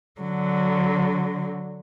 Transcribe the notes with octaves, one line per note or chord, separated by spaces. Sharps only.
D3 F#3